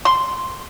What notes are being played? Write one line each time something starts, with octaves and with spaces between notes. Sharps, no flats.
C6